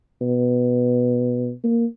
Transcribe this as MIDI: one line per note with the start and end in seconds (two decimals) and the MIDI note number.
0.21 1.51 47
1.64 1.85 58